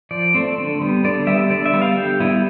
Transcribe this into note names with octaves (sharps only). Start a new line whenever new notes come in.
F3 D5
A3 C4
D3
G3 B3
D3 D5
G3 B3 E5
D3 D5
E5
G3 B3
F5
D3 G4
G3 B3 E4